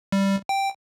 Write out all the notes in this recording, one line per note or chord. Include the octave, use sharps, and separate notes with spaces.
G3
G5